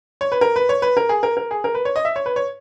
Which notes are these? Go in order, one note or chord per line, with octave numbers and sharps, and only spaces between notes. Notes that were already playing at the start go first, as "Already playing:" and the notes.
C#5
B4
A#4
B4
C#5
B4
A#4
G#4
A#4
A#4
G#4
A#4
B4
C#5
D#5
E5
C#5
B4
C#5